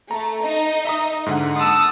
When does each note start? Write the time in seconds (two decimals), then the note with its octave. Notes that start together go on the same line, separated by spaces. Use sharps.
0.11 A3 A#5
0.42 D#4 D#5
0.85 E5 A#5 D#6
1.26 G#2 D3 F#5
1.56 F#5 A5 C6 D#6 E6